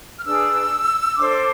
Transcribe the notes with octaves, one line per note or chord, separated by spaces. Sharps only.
F6
D4 G#4 B4 E6
D4 A4 C5 D6